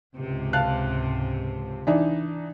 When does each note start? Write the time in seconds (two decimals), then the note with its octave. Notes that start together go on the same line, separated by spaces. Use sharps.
0.16 C#2 G#2 C3
0.53 F5 A5 F#6
1.87 E3 D4 D#4